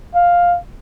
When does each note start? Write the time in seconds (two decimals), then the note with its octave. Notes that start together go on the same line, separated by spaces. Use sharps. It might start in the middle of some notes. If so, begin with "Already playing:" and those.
0.15 F5